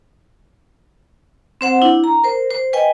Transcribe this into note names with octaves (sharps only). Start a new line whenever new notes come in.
C4 C5 F#5
D4 E4
A#5
A#4 C5
C5
B4 D#5 G5 G#5